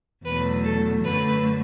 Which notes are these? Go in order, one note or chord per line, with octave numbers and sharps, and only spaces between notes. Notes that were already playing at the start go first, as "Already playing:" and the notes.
E2 B2 F#3 A3 B4
A4
F#2 D3 A3 B4